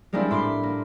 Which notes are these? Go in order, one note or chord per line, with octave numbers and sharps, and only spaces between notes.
G3 G#3 A#3 C4 D4 E4
A2 B5 C6 D6
A#3